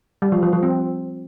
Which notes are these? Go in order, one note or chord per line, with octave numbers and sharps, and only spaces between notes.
G3
F3
F3
F3
C4